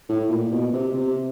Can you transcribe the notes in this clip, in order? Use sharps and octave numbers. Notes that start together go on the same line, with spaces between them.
A2
A#2
B2
C3
C3